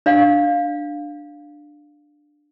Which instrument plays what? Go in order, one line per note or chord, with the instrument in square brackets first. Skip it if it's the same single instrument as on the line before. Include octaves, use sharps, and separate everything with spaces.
[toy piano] D4 D5 F5